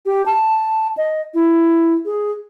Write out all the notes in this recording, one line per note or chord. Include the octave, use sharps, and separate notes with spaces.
G4
A5
D#5
E4
G#4